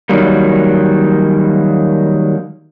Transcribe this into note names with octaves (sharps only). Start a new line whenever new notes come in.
D#3 F#3 G3 A#3